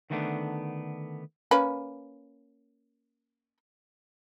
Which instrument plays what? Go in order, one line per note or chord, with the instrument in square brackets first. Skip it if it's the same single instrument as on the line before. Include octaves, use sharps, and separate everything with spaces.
[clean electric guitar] D3 D#3 G3 A3 B3 D4
[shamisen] A#3 C#4 B4